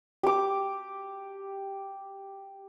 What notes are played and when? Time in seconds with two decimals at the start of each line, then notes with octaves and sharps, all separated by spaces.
0.23 G4 D6